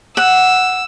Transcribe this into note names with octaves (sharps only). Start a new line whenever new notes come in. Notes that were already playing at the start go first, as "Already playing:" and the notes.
F#5 E6